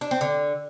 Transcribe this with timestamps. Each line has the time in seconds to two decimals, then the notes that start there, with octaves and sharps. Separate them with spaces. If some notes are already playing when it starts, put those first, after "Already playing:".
0.01 D4
0.11 C4
0.21 D3